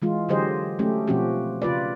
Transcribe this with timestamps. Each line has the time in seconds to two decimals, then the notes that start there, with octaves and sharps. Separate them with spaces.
0.02 E3 G#3 F4
0.29 D3 F#3 G4 G#4 C5 D#5
0.79 F#3 A3 C#4 G4
1.08 B2 F3 C4 C#4 F#4 G4
1.62 C#3 F4 B4 D5